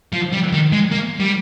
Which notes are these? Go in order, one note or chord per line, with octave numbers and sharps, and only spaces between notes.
F3
G3
D#3
G#3
A#3
G3